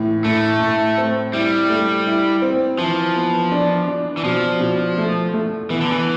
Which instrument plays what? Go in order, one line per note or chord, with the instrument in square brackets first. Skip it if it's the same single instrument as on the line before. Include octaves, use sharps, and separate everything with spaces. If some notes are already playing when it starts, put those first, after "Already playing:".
Already playing: [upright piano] A2 E3
[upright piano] A2 [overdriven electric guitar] A3
[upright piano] A2
C4
[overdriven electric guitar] G3 [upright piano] E4
[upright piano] A3
E4
C4
[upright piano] E3 [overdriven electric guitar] F3
[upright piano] B3
D4
D4
[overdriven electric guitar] E3
[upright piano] B2 [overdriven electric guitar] F3
[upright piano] B2
A3
A3
[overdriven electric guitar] E3 [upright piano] B3
[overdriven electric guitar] D3
E3